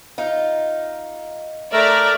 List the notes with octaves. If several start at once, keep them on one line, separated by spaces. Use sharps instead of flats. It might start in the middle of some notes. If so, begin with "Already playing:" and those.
D#4 F4
A3 A#4 D5 E5 A#5